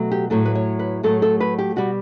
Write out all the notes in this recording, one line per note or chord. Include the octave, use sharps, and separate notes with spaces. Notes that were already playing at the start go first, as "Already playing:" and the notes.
Already playing: B2 F#3 A3
G4
A2 F#3 A3 A4
B4
C#5
B4
A2 F#3 A3 A4
A4
B4
G4
B2 G3 F#4